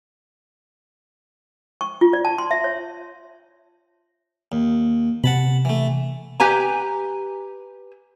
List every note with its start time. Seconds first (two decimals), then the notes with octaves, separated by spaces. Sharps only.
1.81 C#6
2.01 F4
2.13 D5
2.25 A5
2.38 C6
2.51 E5
2.64 C#5
4.52 D#2
5.24 C3 F#5 A5 B5
5.65 E3 A3
6.40 G4 B4 G#5 A#5